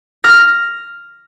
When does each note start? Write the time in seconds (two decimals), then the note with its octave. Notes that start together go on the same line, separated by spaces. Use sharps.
0.24 F6 A#6